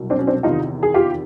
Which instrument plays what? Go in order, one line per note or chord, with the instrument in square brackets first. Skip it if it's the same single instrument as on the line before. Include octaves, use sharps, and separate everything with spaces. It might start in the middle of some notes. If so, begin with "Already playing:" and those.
Already playing: [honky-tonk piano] C2 B2 F#3
C4 D4
C#4
C4 D4
E2 C3 D#3 D#4 F4
G#4
F4 G4